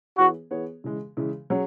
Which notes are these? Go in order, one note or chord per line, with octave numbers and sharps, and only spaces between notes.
E3 B3 F#4 G#4 C#5
E3 B3 G#4 C#5
C#3 E3 G#3
C#3 E3 G#3
F#3 C#4 G#4 C#5